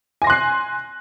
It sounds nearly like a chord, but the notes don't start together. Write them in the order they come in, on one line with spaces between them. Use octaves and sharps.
G#5 A#6 C6 F#6 C7